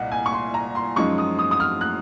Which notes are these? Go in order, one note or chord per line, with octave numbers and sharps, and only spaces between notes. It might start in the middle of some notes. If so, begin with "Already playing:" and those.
Already playing: C2 A#2 D#5 F#5
G#5
C#6
C6
A#5
C6
F#2 F3 G#3 D#4 C#6
D#6
D#6
D#6
F6
F#6